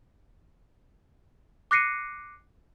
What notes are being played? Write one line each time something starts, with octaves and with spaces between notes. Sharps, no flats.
D6 F#6 A#6 C7 C#7 D#7